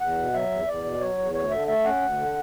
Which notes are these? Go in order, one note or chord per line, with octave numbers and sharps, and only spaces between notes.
E2 F#5
B2
F#3 E5
E2
E2 D5
B2
F#3 C#5
E2
D2 C#5
D3 E5
A3 E5
C#4 F#5
D2
D3